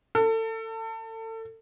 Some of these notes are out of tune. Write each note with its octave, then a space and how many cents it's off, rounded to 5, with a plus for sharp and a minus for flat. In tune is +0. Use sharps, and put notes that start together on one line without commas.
A4 +30